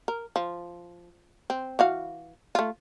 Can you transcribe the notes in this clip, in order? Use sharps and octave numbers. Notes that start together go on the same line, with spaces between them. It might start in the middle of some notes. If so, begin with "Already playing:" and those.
A#4
F3
C4
E3 F#4 F5
A3 F4